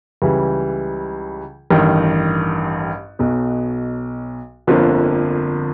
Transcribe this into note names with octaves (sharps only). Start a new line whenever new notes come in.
C#2 C#3 E3 G3
A1 G2 D#3
B1 B2 F#3
G1 F2 D3 F3 A#3